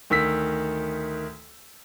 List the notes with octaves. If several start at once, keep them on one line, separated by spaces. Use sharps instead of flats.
D2 D#3 E6 B6